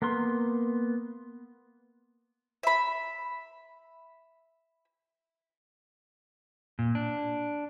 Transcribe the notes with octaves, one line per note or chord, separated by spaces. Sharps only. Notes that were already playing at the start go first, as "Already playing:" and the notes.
A#3 B3 A#4 C6
E5 B5
A#2
D4